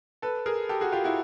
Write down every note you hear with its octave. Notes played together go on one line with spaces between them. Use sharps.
A4 B4
G#4 A#4
G4 A4
F#4 G#4
F4 G4
E4 F#4